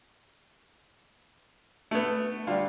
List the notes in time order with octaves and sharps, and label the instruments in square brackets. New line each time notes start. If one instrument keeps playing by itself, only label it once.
[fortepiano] A3 B3
[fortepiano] D3 F4 [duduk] G3